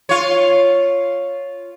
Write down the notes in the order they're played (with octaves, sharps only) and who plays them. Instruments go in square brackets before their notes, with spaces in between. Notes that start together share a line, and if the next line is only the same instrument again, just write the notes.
[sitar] F4 C#5